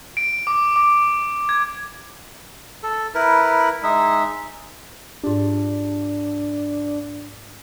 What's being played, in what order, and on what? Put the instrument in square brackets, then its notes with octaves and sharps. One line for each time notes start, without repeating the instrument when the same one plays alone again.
[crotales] D7
D6
D6
G#6
[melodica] A4
E4 A#4 B4
G#3 D#4 E5
[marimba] G#2 F4 G4 [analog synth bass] D4